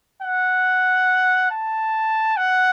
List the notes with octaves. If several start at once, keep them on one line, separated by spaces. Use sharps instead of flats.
F#5
A5
F#5